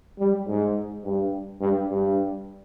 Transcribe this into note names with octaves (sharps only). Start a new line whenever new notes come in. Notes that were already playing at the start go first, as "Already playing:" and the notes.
G3
G#2
G2
G2
G2